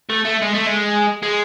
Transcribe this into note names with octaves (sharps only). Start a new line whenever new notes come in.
A3
A3
G#3
A3
G#3
G#3